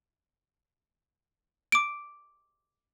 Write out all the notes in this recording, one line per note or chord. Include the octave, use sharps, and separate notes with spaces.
D6 D7